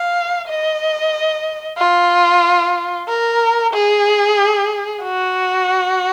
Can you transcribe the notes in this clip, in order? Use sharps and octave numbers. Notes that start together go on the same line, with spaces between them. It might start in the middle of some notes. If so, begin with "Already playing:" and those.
Already playing: F5
D#5
F4
A#4
G#4
F#4